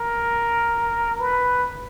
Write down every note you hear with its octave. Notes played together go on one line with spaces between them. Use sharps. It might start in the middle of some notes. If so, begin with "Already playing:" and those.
Already playing: A#4
B4